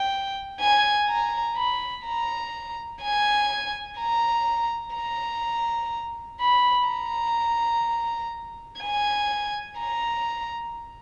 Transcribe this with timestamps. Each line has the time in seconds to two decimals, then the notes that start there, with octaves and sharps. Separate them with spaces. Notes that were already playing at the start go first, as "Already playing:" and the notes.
Already playing: G5
0.60 G#5
1.08 A#5
1.57 B5
2.05 A#5
3.02 G#5
3.99 A#5
4.95 A#5
6.40 B5
6.88 A#5
8.81 G#5
9.79 A#5